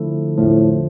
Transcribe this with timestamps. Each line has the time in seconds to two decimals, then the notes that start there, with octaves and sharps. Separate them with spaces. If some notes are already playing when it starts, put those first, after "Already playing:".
Already playing: D3 F3 A3 E4 A4
0.37 E2 A2 D3 F3